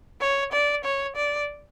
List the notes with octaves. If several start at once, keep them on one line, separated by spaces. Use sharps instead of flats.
C#5
D5
C#5
D5